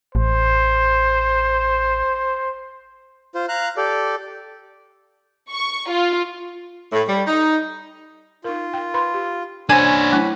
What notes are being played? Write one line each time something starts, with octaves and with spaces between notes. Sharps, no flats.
A1 C5
F4 C5
F5 A#5 F#6
G4 A4 D5
C#6
F4
A2
G3
D#4
D#4 F4 A#4
G5
B4 B5 C6
G4
C#4 D4 C5 G#5 B5
F#3 A3 E4